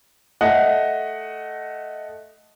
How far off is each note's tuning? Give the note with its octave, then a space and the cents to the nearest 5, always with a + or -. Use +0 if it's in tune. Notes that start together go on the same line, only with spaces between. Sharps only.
A3 -5 D#5 +0 F#5 +5